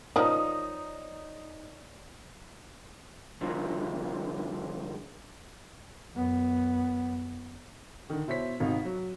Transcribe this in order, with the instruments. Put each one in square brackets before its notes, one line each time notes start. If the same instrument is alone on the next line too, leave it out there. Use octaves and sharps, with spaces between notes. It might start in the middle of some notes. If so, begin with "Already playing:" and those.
[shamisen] F3 A#4 [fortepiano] D#4 [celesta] C#5 D5 A#5 [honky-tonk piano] D#6
[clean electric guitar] C2 D3 D#3 F3
[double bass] F#2 B3
[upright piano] D3 D#3
B2 E4 C5 C#5 B6
G#1 C3 D#4 F5
F#3